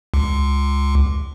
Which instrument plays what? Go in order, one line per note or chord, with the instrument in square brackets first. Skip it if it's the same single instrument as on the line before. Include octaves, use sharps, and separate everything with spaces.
[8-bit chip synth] C#2